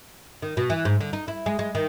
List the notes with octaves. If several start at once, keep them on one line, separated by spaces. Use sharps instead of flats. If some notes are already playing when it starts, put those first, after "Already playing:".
D#3
B2
E3
G#2
D3
D#4
E4
G#3
G#3
D#3